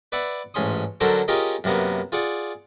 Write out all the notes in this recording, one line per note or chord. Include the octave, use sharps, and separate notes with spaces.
B4 D5 E5 F#5
A1 G#2 C#4 C6 D#6
D3 F#3 C#4 A4 A#4 C5
C#4 F4 G4 G#4 A#4 D#5
F#2 C3 A#3 B3
F4 G#4 D5 F#5